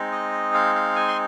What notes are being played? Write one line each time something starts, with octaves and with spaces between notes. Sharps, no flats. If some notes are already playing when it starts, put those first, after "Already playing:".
Already playing: G#3 C4 D#4
D#5
F5
F5
G#5
C6